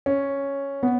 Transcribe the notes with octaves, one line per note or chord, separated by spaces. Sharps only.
C#4
B3